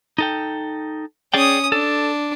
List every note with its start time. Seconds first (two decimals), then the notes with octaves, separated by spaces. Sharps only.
0.18 D#4 A4 G5
1.34 C#4 G#4 D5 G5 D#6
1.72 D4 A4